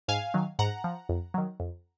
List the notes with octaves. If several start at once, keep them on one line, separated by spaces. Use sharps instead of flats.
G#2 F5 G#5
D#3 F#3
G#2 F#5 A#5
F3
F2
D#3 F#3
F2